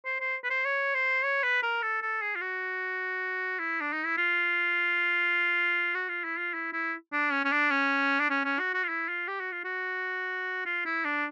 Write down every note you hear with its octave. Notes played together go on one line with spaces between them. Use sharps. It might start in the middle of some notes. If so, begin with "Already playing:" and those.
C5
C5
B4
C5
C#5
C5
C#5
B4
A#4
A4
A4
G#4
F4
F#4
E4
D4
D#4
E4
F4
F#4
F4
E4
F4
E4
E4
D4
C#4
C#4
D4
C#4
D4
C#4
C#4
F#4
F#4
F4
E4
F4
G4
F#4
F4
F#4
F4
E4
D4